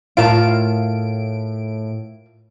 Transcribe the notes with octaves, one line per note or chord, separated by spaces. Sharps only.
A2 F4 A#4 A5 D7